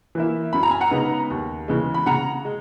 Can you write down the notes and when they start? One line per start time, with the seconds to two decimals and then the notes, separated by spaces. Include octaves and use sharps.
0.15 E3 A#3 E4
0.53 F#2 B5
0.63 A#5
0.71 G#5
0.81 F#5 A#5
0.91 C#3 G#3 B3 D#4
1.30 D#2
1.68 C#3 E3 G#3
1.94 B5
2.06 C#3 F#5 A#5
2.45 G#3